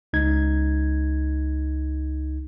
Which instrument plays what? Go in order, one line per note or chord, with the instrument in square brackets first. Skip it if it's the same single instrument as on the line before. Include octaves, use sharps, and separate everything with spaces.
[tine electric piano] C#2 D#4 G#6